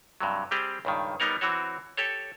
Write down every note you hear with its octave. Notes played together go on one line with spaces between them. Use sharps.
G2 C3 F#3
G3 C4 G4 G#4
C#2 G2 D#3
G3 B3 D#4 A#4 C#5
E3 C4 F#4 C#5
G4 A4 C#5